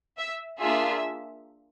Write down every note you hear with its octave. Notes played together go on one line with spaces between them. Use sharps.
E5
A#3 D4 F4 G#4 E5